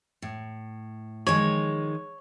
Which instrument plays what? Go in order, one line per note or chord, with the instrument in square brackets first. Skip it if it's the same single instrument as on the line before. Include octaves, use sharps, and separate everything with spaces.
[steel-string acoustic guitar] A2
[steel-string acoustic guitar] D#3 F3 G#3 [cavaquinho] C#5